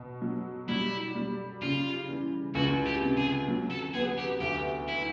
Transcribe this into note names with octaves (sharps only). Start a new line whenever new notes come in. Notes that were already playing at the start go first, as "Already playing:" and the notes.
Already playing: B2
F#3
G3 E4
G3
C#3 F4
E3
C#2 F#4
G4
C3
G#4
F#3
A4
B3 G#4
G4
D2 G4
E4